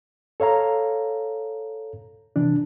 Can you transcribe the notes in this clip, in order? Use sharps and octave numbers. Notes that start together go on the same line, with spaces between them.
A4 C#5 F5 A#5
C3 E3 D4